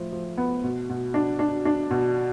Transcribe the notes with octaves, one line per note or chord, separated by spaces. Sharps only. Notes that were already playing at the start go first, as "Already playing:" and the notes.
Already playing: A2 F3
F3
B3
B2
B2
D4
D4
D4
B2